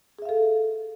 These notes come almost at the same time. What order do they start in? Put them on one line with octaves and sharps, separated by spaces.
G#4 E5 F5 A4